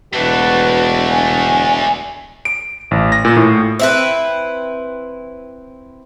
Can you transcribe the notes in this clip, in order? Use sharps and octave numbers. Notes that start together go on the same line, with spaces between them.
E1 A3 D4 F#4 B4
G#5
D7
A1
A#6
A#2
A2
C4 E4 B4